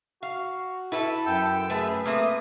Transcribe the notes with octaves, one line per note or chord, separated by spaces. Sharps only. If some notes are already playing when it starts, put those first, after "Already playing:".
F#4 F5
E4 A4 B4 E5
F#2 G5 E6
A3 G#4 B4
A3 A#3 C4 D#6